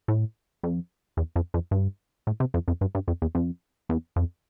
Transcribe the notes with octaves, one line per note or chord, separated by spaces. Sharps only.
A2
F2
E2
F2
F2
G2
A2
C3
F2
F2
G2
G2
F2
E2
F2
E2
F2